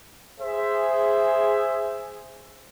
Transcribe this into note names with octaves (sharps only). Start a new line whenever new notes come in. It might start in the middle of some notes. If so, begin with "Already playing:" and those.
G#4 C5 E5